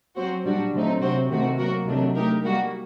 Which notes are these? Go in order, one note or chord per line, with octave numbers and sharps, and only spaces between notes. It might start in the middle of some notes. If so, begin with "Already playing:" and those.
F#3 C4 F#4 C5
A#2 G3 D4 F#4
D3 F#3 A3 C4 D#4
C3 F#3 C4 F#4 C5
C3 D#3 A3 C4 F#4
F#3 A#3 F#4 A#4
C3 D#3 F#3 A3 D4
A3 D#4 G4 A#4
G3 A#3 F#4